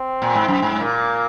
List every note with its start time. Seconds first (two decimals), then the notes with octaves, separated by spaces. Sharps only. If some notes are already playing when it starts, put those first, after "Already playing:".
Already playing: C4
0.22 A#2
0.35 G#2
0.48 F#2
0.62 G#2
0.80 A#2 A#3